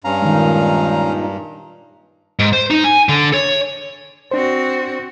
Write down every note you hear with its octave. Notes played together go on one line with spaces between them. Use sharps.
G2 C#4 F5 A#5
A#2 D#3 G#3 D#4
G#2
C5
D#4
G#5
D3
C#5
C4 D4 F#4 C5